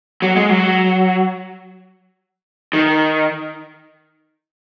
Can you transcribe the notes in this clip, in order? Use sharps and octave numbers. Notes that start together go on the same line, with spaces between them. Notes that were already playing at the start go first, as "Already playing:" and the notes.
F#3
G#3
F#3
D#3